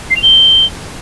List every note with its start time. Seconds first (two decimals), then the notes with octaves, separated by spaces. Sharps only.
0.10 C7
0.16 F7
0.22 G7